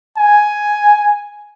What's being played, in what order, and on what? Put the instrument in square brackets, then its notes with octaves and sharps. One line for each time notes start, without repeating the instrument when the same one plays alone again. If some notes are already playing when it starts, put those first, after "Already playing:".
[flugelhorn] G#5